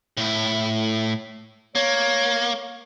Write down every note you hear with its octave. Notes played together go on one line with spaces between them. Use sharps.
A2 E4
A#3 C#5